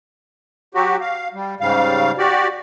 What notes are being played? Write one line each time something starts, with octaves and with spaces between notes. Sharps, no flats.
F#3 F#4 G4
F5
G3
G#2 C#3 G3 F5
F#4 G4 D5